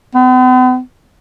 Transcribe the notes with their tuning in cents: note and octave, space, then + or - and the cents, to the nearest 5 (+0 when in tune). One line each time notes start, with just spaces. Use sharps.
B3 +45